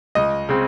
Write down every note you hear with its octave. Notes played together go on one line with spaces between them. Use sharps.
C#2 D#5
C#3 G#3 C4